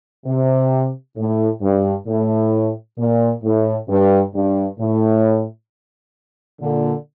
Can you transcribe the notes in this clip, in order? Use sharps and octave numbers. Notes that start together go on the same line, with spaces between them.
C3
A2
G2
A2
A#2
A2
G2
G2
A2
A#2 D3